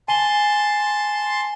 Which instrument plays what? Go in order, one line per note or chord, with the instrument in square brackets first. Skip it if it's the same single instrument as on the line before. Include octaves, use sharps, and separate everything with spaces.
[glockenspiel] G#5 G7 [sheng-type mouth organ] A5 C6